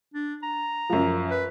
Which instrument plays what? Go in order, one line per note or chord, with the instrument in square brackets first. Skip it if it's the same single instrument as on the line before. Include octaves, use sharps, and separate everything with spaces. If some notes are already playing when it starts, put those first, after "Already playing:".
[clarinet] D4
A#5
[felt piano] F#2 F3
[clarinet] B4